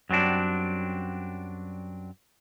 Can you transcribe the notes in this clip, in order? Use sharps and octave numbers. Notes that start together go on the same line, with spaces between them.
F#2 F#3 G3 C4 D4